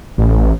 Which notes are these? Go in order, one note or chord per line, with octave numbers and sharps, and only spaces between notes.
A1